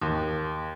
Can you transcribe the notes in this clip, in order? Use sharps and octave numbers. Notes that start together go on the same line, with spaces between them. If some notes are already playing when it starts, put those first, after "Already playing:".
D#2